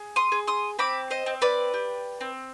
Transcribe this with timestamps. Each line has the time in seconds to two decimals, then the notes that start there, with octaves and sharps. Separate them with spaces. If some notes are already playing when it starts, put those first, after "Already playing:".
Already playing: G#4
0.16 C6 D#6
0.32 G#4
0.47 C6 D#6
0.79 C4 B5 D6
1.10 C5 D#5
1.26 C4
1.42 B4 D5
1.73 G4
2.21 C4